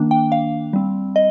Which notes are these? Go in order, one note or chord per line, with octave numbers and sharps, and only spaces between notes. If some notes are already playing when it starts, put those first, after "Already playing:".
Already playing: D#3 A#3 D4
G5
F5
G3 C4
D#5